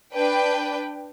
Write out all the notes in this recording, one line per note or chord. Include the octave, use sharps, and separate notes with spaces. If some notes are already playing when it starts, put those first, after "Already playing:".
D4 B4 G5